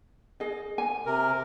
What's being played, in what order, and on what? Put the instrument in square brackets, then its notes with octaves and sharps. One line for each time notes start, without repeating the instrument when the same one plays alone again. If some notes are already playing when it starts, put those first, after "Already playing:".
[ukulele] G#4 D#5
G#5
[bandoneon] C3 A#4